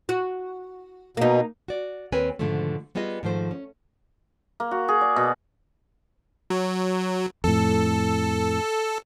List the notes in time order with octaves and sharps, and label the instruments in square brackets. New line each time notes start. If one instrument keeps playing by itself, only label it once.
[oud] F#4
[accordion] B2 [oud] A#3 D#4
[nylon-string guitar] F#4 D5
D#2 C4 A#4 B4 C#5 G#5
G#2 B2 D3 D#3 F3 A3
G3 B3 F4 G#4 D#5
G#2 D#3 F3 A3 C5
C#4
[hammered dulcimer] A#3
F#4
G#4
D5
B2
[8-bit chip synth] F#3
[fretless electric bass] F2 A2 [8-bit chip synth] A4